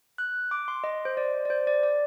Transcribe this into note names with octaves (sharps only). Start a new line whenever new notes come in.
F#6
D6
C6
D#5
C5
D5
D5
C5
D5
D5